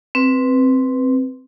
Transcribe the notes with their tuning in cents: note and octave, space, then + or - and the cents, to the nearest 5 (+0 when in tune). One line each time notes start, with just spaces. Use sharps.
C4 +0 B4 +0